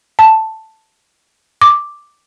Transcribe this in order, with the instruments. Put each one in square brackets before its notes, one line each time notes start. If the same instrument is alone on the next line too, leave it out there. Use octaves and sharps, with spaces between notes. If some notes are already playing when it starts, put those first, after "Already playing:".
[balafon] A5
D6